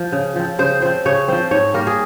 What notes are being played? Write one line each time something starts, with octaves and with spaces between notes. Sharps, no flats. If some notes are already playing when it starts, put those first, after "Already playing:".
Already playing: F3
C#3
F3 C4
C#3 C5
F3 C4 C5
C#3 C#5
F3 C4 C5
G#2 C#5
G3 A#3 A#4
G#4